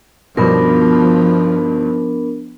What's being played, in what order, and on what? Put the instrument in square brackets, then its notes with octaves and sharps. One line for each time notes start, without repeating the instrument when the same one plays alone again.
[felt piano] B1 G2 B2 [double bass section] F3 [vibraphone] B3 D4 A#4